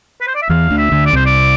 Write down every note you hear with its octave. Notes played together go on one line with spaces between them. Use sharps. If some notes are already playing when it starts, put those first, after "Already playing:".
B4
C5
D5
E5
E2 E3 F5
D2 D3
E5
D2 D3
D5
C2 C3 C5
D5